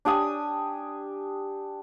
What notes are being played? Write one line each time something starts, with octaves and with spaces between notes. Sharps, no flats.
D4 G4 G#5 D#6